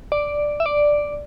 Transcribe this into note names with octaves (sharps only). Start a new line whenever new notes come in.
D5
E5
D5